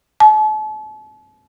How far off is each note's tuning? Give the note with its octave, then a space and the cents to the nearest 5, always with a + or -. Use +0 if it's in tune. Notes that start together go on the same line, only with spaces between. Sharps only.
A5 -40